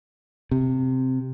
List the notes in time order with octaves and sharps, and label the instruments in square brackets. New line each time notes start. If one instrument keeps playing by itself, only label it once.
[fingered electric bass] C3